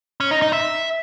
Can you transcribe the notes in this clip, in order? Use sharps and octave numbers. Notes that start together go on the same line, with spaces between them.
C#4
D#4
D#4
E5